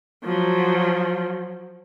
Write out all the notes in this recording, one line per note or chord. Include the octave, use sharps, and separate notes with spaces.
F3 F#3